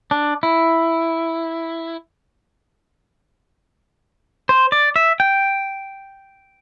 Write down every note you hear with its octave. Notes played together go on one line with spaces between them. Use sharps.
D4
E4
C5
D5
E5
G5